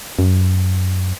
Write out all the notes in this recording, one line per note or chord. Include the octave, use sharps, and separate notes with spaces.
F#2